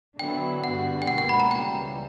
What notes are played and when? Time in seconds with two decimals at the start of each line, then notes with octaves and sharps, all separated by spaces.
0.19 D3 F#3 B3 E4 G5
0.63 G2 D3 G3 B3 F#4 F#5
1.02 G5
1.07 C#2 B2 A#3 D4 F#4 F#5
1.18 F#5
1.29 B5
1.40 A#5
1.51 C#2 C#3 E3 G3 G5